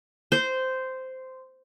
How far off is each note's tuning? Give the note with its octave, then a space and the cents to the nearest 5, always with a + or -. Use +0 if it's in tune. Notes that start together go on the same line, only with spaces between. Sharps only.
C5 -10